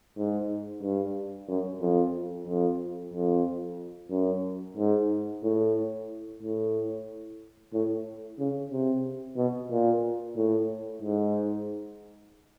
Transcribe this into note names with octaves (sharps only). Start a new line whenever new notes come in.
G#2
G2
F#2
F2
F2
F2
F#2
G#2
A2
A2
A2
C#3
C3
B2
A#2
A2
G#2